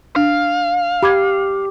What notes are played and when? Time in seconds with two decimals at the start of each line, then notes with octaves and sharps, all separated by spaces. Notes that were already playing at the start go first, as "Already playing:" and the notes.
0.16 D4 F5
1.03 G4 B5 D6 G#6